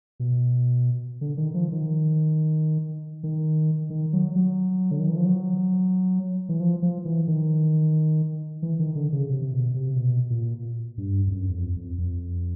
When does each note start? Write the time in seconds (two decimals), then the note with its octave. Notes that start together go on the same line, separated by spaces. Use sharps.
0.20 B2
1.21 D3
1.37 D#3
1.54 F3
1.72 D#3
3.23 D#3
3.90 D#3
4.13 F#3
4.36 F#3
4.91 D3
4.99 D#3
5.08 E3
5.17 F3
5.25 F#3
6.49 E3
6.60 F3
6.82 F3
7.05 E3
7.27 D#3
8.62 E3
8.79 D#3
8.95 D3
9.12 C#3
9.29 C3
9.52 B2
9.74 C3
9.96 B2
10.30 A#2
10.98 G2
11.27 F2
11.31 F#2
11.49 E2
11.53 F2
11.76 F2
11.98 F2